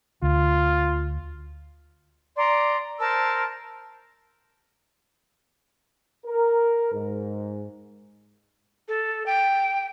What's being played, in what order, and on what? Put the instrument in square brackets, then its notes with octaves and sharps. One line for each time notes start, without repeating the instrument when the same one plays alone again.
[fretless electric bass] D2 [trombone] F4
[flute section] D5 A#5 C6
A#4 C5 A5 E6
[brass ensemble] A#4
G#2
[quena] A4
G5